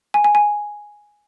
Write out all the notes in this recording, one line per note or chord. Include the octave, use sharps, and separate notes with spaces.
G#5
G#5
G#5